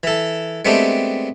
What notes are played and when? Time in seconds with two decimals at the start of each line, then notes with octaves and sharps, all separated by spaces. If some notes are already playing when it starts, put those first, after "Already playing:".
0.03 E3 A4
0.65 G#3 A3 B3 C4 D4 G4